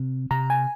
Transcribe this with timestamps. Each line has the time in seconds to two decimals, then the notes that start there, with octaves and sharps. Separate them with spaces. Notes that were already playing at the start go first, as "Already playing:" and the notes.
Already playing: C3
0.31 C3 A#5
0.50 G#5